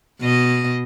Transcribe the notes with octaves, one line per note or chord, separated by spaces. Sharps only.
B2 D#5